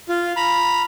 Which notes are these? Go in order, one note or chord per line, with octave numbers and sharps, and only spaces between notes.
F4
A#5 B5